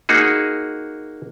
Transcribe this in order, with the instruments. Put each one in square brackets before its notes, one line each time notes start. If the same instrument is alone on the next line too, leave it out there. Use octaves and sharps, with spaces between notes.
[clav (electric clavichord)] A#3 D#4 F#4 G#4